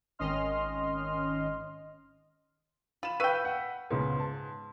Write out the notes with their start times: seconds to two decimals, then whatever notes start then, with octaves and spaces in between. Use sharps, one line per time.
0.19 G#1 D#3 C#4 D#5 C6 F6
3.03 F4 B5 E7
3.20 B4 F5 G5 C#6 E6 F#6 B6 D#7
3.45 F#5
3.91 C#2 G#2 C#3 B3
4.20 A5